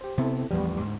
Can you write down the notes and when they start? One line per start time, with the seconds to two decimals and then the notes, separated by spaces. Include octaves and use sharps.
0.01 G4 C5
0.18 C3 B3 C4 E4 A4
0.51 A1 E2 F3 G3 B3
0.80 D2 G#2